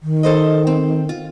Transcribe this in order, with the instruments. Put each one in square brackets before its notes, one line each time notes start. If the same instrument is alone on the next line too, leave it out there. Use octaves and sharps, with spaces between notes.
[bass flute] D#3
[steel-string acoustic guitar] A4 C5 D#5
C4
F4